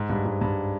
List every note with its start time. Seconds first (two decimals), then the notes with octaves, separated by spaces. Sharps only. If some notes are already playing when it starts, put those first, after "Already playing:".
Already playing: G#2
0.10 G2
0.25 G#2
0.41 G2